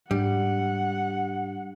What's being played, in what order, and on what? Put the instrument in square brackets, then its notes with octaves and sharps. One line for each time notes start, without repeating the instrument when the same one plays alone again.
[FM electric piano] G#2 D4 [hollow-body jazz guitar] G3 [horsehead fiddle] F#5